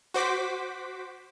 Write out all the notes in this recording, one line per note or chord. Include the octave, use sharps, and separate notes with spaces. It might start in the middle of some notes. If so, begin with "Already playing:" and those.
F#4 C5 D6 B6